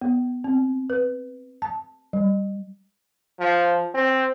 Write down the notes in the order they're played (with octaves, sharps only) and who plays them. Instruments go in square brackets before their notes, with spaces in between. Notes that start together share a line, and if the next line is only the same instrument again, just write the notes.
[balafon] B3
C4
B4
A5
G3
[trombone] F3
C4